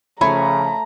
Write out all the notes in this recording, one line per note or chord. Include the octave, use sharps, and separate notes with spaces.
C#3 F3 A3 C#5 G#5 A#5 B5